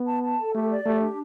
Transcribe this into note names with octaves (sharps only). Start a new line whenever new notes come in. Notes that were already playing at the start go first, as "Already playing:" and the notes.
Already playing: B3
A5
A5
A4
A3 G4
D5
A3 G4
D4